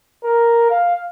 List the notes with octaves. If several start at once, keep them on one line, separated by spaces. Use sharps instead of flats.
A#4
F5